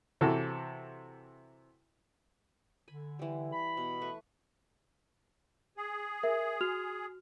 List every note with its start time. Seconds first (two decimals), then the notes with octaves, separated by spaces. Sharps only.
0.21 C3 E3 F#4 A4
2.88 D3 G#5 B5
3.19 E3 G3
3.52 B5
3.77 B2
4.01 A3 B4 C#6
5.77 G#4
6.23 A#4 E5
6.61 F#4 F6 F7